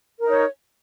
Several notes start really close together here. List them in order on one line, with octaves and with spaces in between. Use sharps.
A#4 D#4 C#5